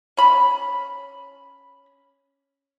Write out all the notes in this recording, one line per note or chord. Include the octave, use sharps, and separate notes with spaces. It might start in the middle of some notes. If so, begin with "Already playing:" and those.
C#4 B5